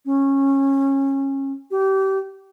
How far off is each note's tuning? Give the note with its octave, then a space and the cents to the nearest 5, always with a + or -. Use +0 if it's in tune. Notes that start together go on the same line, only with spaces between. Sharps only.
C#4 -20
G4 -25